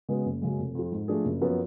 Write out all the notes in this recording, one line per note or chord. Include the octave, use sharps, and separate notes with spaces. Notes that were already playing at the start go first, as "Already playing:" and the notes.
C#3 G#3 B3 F#4
F#1
F#2 C#3 G#3
F1
F2 F3
G#2
F3 A3 D4 G#4
F#1
F#2 F3 B3